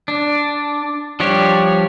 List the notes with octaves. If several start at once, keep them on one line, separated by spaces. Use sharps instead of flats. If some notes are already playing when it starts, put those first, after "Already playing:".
D4
F3 G3 D4 G4 C#5